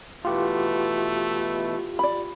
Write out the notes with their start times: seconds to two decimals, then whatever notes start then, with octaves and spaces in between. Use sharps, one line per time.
0.25 B2 E3 A3 E4 F4 G4
1.99 D5 B5